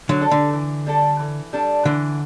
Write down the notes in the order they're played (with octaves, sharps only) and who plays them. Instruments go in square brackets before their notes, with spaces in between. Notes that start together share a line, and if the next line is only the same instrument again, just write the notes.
[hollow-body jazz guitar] D3 F#3
[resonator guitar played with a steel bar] G3 D4 A4
[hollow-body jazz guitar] D3
[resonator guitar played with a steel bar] E3
G3 D4 A4
E3
G3 D4 A4
[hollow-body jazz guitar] D3 [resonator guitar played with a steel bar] E3